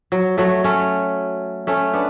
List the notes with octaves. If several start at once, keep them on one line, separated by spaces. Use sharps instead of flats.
F#3
F#3 A3
A3 C#4
A3 C#4
B3 D4